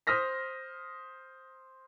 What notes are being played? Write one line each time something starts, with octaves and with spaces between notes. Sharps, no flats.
C5 D#6 F6 A#6 B6